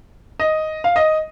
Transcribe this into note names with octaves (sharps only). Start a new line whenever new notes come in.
D#5
F5
D#5